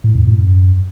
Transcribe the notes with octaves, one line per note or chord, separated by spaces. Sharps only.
A2
F2
A2
F#2